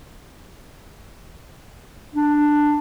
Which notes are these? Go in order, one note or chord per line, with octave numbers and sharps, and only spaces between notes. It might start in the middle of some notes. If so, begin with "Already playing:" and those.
D4